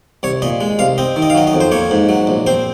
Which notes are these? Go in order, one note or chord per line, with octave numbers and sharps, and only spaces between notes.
C2 C#5
A#2 D#5
G#3
C2 F5
C4 D#5
D#3
D#5
F5
F#3 D#5
D#5
F2
C5
A#3 C#5
G#2
F#3
A#1
C4 C5